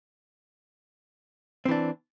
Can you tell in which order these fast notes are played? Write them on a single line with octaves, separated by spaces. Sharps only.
C4 E3 D4